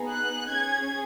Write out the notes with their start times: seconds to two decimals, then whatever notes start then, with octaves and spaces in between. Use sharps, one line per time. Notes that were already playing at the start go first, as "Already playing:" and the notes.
Already playing: B3 D#4 G#4
0.11 F#6
0.49 C#4 G#4 G#6